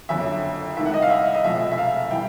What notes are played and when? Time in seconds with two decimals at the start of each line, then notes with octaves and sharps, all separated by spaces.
0.09 F#1 F2 D3 F#3 E5
0.76 C2 C3 D#3 E5
0.86 F#5
0.94 D#5
1.02 F5
1.10 E5
1.34 D#5
1.44 E1 E2 C3 F3 A3 E5
1.72 E5
1.78 F5
2.11 E3 G3 G5